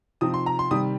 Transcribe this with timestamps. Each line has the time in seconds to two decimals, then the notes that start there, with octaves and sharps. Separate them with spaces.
0.21 C3 F3 C4 D#4 D#6
0.34 C6
0.46 A#5
0.59 C6
0.71 C3 D#3 G3 D#6